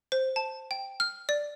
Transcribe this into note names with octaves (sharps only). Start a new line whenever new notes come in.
C5
A5
G5
F6
D5